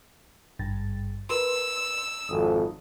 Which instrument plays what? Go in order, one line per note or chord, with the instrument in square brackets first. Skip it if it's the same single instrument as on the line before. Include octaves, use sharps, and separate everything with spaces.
[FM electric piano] G#1 G2 A6
[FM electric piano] A#4 B4 C6 [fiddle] E6
[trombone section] G#1 F2 [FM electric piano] D#6